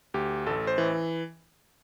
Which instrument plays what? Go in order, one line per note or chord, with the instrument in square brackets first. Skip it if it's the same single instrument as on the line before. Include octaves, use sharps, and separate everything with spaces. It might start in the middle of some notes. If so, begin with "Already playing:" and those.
[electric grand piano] D2 G4
A1 A4
C5
E3